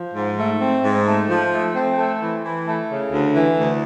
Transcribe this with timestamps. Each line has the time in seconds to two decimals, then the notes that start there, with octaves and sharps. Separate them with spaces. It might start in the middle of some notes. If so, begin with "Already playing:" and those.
Already playing: F3
0.14 G#2
0.38 A3
0.61 C4
0.84 G#2
1.07 A3
1.29 F3
1.52 A3
1.74 C4
1.97 A3
2.20 E3
2.44 E3
2.66 A3
2.89 C#3
3.12 D2
3.34 E3
3.57 D2